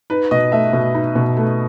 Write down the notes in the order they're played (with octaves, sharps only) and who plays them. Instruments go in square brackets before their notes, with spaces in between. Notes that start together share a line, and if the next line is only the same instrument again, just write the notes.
[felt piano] D#4 [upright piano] B4
[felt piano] B2 [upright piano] D#5
[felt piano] A3 [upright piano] E5
[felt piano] B2
D#4
B2
A3